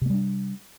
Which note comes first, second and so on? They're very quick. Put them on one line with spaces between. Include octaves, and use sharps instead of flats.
C3 A#3 G3 D4